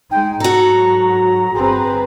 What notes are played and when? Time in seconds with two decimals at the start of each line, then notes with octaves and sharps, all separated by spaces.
0.11 G#3 D#4 G5
0.40 G#2 F#3 F#4 A4 A#5
1.55 G1 C4 G#4 B4 C5